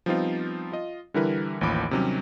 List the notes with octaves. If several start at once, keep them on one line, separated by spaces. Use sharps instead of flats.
F3 G3 B3 C4 D#4 F4
F4 D#5
D3 E3 G3 E4 A#4 B4
A1 D#2 F3 B5 D6 D7
C3 D#3 F#3 G3 C#4